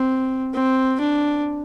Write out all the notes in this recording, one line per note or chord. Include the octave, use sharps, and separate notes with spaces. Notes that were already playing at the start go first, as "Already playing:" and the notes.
Already playing: C4
C4
D4